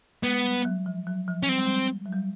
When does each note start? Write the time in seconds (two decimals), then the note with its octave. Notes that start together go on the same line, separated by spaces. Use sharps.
0.23 G#3 B3
0.44 G3
0.65 F#3
0.86 F3
1.07 F#3
1.28 F3
1.43 C#4
1.49 G3 C4
1.57 G#3
1.65 G3
2.06 F#3
2.12 G3